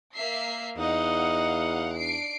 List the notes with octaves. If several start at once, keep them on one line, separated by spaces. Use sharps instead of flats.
A#3 E5 C7
E2 D#4 D#5 F5 F#5
D4 C7 D7